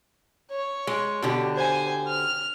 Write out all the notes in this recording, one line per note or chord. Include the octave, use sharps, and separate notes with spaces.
C#5
G#3
B2 D3 G4
C5 G#5
F6